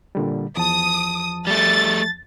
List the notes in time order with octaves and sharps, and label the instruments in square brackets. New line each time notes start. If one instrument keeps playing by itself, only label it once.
[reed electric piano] A#2 D3 G3
[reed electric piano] E2 [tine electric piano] F3 A5 [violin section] D#6
[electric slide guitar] G3 A3 [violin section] A6